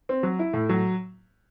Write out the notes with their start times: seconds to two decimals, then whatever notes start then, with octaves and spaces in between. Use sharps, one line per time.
0.09 C4
0.23 F#3
0.39 E4
0.53 A2
0.69 F#3